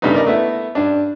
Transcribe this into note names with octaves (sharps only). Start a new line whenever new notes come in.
G2 C#3 G3 A3 B3 D#4
A#4 D5 D#5
A3 B3 E4
G2 D4